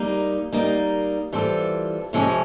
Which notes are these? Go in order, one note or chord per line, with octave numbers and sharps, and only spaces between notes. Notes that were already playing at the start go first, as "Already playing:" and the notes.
Already playing: G3 A#3 D#4
G3 A#3 D#4
E3 G3 C4 F4 A4
F2 C3 F3 G#3 C#4